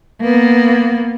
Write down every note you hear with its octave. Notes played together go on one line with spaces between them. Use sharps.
A#3 B3